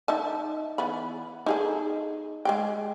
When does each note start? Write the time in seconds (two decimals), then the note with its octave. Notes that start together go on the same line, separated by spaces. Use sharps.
0.08 D#4 E5 A5
0.78 E3 B3 B5
1.46 D#4 G#4 A4
2.45 G#3 G#4 G5